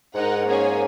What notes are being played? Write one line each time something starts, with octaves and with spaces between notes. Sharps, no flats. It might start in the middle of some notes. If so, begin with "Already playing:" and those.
G#2 D#4 A#4 F#5
A#3 C#4 G#4 C#5 G#5